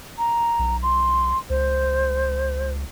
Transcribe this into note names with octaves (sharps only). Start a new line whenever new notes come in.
A#5
B1
C6
C#2 C5